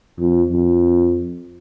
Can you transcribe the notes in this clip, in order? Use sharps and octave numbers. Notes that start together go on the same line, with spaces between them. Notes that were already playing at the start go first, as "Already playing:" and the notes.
F2
F2